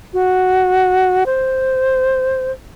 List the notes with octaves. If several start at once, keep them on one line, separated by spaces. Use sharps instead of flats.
F#4
C5